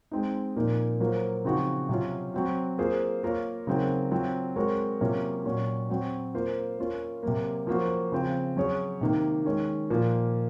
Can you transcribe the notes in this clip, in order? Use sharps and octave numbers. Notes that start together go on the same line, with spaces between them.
G#3 C4 D#4
A#2 F3 A#3 D#4
F#3 A#3 F4 C5
C#3 F3 C4 D#4 F#4
C3 F#3 C#4 F4
F#3 C4 F#4
A#3 F4 G#4 C5
A#3 F4 A#4 C#5
C#3 F#3 C4 D#4 A#4
F#3 C4 F4
G#3 C4 F#4 A#4 C#5
C3 F#3 A#3 C#4 F4
A#2 F#3 C#4 F#4
F#3 C4 F#4 C#5
A#3 F4 C5
A#3 C#4 F4
C3 F#3 A#3
F3 A#3 C#4 F#4 C5
C#3 F3 C4
F#3 C#4 G#4 C#5
C3 D#3 A#3
D#3 G#3 C#4
A#2 F3 A#3 F4 A#4